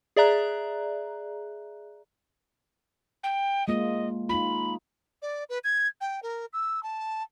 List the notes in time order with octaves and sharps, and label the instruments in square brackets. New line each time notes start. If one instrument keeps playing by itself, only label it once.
[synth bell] G#4 D5 E5 A#5 F#6
[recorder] G5
[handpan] G#3 A#3 F4 [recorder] D#5
[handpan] D#4 F4 [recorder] B5
[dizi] D5
B4
G#6
G5
A#4
E6
A5